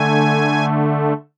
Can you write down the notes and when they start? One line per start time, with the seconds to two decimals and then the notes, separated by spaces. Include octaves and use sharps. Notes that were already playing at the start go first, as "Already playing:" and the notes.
Already playing: D3 A3 G#5